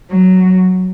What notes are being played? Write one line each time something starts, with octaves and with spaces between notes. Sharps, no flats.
F#3